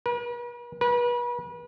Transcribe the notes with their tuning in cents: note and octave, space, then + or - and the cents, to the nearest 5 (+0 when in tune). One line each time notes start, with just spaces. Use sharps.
B4 -45
B4 -35